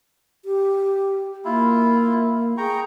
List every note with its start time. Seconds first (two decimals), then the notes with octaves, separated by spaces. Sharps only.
0.45 G4
1.45 A#3 E4 F4
2.58 G#4 G5 A#5 C#6